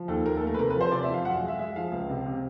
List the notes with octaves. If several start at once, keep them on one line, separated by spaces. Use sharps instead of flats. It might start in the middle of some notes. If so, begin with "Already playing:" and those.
Already playing: F3
D#2 A4
D#2 A#4
A4
A3
A#4
B4
C3 A#4
B4
F3
C5
C3 D5
E5
F3 F5
F#2 F#5
F5
G#3
E5
G#3 E5
F3 F5
C#2
C3
C3